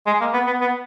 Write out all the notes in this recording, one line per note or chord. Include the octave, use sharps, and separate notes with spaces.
G#3
A#3
B3
B3
B3